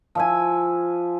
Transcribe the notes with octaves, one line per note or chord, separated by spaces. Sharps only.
F3 E5 G#5